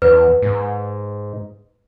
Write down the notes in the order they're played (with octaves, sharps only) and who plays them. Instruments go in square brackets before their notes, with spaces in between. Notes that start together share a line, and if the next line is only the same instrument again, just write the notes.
[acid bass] E2 [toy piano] B4
[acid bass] G#2